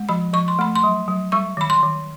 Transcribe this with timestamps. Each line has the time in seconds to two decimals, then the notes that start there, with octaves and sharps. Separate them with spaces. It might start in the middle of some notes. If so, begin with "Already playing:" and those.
Already playing: G#3
0.09 F3 B5
0.33 F3 C#6
0.48 C6
0.59 A3 B5
0.75 C6
0.84 F#3
1.08 F#3
1.32 G3 C#6
1.57 D#3 B5
1.70 C6
1.83 D#3